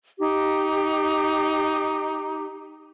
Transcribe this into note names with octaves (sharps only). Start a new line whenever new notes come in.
D#4 G4